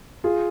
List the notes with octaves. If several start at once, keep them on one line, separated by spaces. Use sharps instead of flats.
F4 G#4